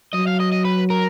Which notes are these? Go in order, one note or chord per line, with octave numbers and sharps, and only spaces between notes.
F#3 D#5
F5
D#5
D#5
B4
A#4